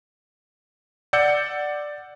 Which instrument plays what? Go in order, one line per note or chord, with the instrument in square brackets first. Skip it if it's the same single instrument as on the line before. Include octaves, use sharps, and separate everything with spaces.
[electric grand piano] D5 F#5 E6 G6 C#7